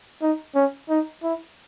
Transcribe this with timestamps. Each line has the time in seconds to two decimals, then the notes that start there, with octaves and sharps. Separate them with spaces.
0.22 D#4
0.55 C#4
0.90 D#4
1.23 E4